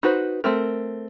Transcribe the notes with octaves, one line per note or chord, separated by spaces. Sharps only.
D#4 F#4 B4 C5
A3 C4 A#4